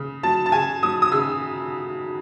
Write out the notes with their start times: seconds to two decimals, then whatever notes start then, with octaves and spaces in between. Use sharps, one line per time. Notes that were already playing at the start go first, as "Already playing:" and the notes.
Already playing: C#3
0.23 F#3 A5
0.46 A5
0.52 C#3 G#5
0.83 F#3 D#6
1.02 D#6
1.12 C#3 E6